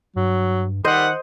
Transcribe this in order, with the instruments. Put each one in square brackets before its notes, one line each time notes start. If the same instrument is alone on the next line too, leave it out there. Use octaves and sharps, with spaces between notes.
[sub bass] G2 [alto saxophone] F#3
[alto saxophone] D#3 [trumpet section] G3 F#5 [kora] C5 D#5